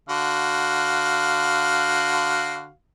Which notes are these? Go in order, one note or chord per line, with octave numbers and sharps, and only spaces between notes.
D3 F#4 F5